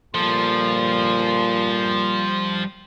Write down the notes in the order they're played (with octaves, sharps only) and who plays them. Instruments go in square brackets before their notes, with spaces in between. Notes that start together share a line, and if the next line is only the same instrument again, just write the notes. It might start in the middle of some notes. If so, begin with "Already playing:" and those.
[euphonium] A#2 [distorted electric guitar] F3 [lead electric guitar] G3 A4 [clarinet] C6